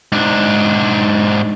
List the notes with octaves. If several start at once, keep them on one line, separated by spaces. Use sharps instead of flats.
G#2 D4